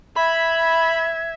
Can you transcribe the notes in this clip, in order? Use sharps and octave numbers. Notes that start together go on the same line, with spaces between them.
E5 B5 G#6